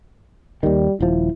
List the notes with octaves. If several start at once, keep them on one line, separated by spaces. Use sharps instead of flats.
D#2 D#3 G3
D#1 F3 E4